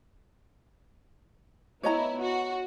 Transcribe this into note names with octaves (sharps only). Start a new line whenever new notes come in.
B3 E4 C#5 D#5 A#5
F#4